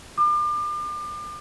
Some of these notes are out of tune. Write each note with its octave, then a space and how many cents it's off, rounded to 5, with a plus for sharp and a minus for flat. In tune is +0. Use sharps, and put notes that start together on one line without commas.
D6 +35